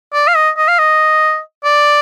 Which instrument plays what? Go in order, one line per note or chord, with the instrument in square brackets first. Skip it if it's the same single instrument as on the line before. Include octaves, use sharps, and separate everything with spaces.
[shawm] D5
F5
D#5
D#5
F5
D#5
D5